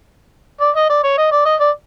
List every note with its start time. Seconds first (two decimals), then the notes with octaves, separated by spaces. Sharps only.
0.61 D5
0.76 D#5
0.90 D5
1.04 C#5
1.18 D#5
1.32 D5
1.46 D#5
1.60 D5